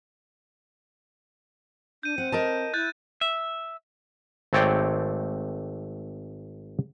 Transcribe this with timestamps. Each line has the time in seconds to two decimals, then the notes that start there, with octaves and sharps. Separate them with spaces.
2.03 D4 G6 D#7
2.18 C4 F#5
2.32 A#4 D#5 A5
2.74 E4 F#6 G6 A6
3.21 E5
4.53 G#1 A3 C4 C#5 D5 G5